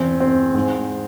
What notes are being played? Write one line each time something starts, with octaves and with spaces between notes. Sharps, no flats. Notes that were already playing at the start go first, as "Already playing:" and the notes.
Already playing: E2 C4
C4
G#2